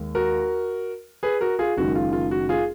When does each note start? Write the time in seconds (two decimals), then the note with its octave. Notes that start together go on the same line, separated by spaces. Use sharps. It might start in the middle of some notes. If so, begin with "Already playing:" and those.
Already playing: D#2 D#3 G#3
0.15 F#4 A#4
1.23 G#4 B4
1.41 F#4 A#4
1.59 F4 G#4
1.77 F#1 F#2 D#3 G#3 F#4
1.95 F4
2.13 F4
2.31 F#4
2.49 F4 G#4